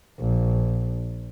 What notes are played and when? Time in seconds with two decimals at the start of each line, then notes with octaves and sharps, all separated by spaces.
0.20 A#1